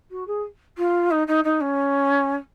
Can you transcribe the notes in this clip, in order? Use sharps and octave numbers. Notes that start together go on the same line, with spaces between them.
F#4
G#4
F4
D#4
D#4
D#4
C#4